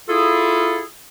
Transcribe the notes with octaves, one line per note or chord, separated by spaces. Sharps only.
E4 F4 G#4 A4